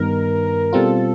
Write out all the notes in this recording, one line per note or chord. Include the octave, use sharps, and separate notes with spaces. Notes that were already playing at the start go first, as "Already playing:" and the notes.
Already playing: G2 D#3 G3 B3 D#4 A#4
B2 G3 C4 F4 A4